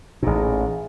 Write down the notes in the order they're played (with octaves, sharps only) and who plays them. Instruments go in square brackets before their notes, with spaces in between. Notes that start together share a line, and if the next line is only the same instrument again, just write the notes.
[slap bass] A1 A#2 [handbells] D#4 G#4